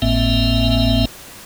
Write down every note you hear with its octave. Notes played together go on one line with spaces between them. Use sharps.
G#1 A2 A#3 C4 E5